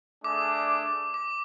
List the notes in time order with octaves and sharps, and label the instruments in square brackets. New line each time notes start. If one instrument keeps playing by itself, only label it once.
[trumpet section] A3 D4 G#4 D5 [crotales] D6
[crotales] D6